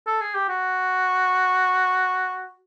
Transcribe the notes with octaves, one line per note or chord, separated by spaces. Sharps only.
A4
G#4
G4
F#4